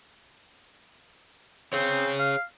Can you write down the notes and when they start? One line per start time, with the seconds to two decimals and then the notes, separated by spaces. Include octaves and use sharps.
1.73 C4 G#4 C#5
2.19 F5